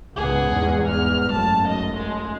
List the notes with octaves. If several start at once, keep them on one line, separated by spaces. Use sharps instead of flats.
C#2 G#2 B3 G#4 F#5
E2 G#2 G3
F6
G#1 F#2 A3 A5
D#5
G#3